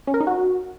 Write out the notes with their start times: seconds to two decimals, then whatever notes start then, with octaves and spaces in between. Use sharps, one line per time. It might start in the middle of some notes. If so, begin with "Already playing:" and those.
0.07 C#4
0.14 A#4
0.20 D#4
0.27 F#4